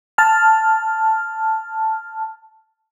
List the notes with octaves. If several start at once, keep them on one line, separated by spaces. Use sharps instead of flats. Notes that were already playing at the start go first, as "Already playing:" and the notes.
A5 F6